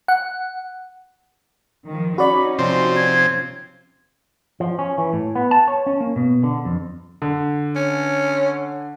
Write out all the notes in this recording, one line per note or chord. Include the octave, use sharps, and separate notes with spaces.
F#5
D#3 F3
C#4 D#4 F#4 D5 B5
C3 F3 C4 C6
G#6
F3
C#4
E3
A2
B3
A5
C#5
C#4
A#3
B2
D3
F2
D3
C#4